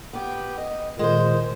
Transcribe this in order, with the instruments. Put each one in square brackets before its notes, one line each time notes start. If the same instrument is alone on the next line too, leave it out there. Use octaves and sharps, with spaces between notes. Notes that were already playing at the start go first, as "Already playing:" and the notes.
[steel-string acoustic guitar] B3 G4
D#5
[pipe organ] A#2 D#3 [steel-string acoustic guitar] G#3 C5